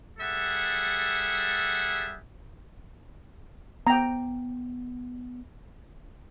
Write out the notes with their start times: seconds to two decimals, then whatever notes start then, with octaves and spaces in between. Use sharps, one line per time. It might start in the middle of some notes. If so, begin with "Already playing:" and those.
0.19 G3 G#4 A4 E5 F#5
3.87 B3 G5 A#5